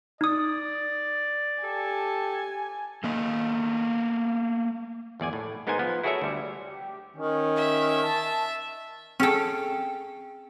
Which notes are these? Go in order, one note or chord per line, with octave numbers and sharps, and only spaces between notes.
D#4 D5 D#6
G4 A4 G#5 A5
A3 A#3 D#5
G#1 E2 D5 G#5
A2
G#3 B3 D#4 A#4 C5 G#5
F3 B3
E4 F#4 G#4 A4 C#5 E5
D2 G3
G4
D#3 C#4
E5
A5
C4 C#4 G#4 A4 G5